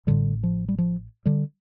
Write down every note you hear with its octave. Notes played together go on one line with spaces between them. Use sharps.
A1 A2 D3 G3
F3
G3
F3
D3 G3